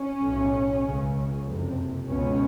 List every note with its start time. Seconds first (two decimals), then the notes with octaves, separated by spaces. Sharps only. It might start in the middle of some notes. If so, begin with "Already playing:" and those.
Already playing: C#4
0.23 B1 A2
0.84 C#2 C#3
1.46 F#1 F2 C3
2.07 C#2 B2 C#4